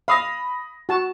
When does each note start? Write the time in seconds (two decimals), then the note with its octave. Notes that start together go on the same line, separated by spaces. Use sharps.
0.08 F5 B5 D#6 A#6
0.89 F#4 A5